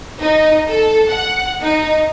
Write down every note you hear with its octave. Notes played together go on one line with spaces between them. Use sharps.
D#4
A4
F#5
D#4